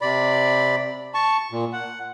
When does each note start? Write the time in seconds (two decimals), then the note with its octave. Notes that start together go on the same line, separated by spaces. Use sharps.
0.01 C3 D5 B5
1.14 A5 C#6
1.51 A#2
1.73 F#5